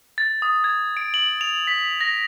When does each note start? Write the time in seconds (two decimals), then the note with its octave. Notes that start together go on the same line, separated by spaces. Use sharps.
0.18 A6
0.42 D#6
0.64 G#6
0.97 D7
1.14 F#7
1.41 F7
1.67 B6
2.01 A#6